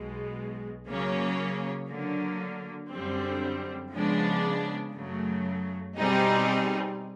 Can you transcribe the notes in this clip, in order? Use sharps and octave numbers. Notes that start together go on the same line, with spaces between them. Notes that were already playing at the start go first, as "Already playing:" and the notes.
Already playing: B1 B2 G#3
C#3 F#3 A#3 C#4
D3 F#3 A#3
F#2 D3 G3 C4
C#3 F3 G#3 B3 D4
F#2 C#3 F#3 A3
B2 G3 C4 D#4 G#4